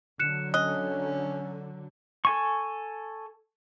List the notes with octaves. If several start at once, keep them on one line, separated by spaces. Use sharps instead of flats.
D3 F#3 F#6 C#7 E7
C#4 D#5 F#6
A4 G#5 C#6